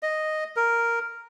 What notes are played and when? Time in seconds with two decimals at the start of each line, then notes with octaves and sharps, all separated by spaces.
0.03 D#5
0.56 A#4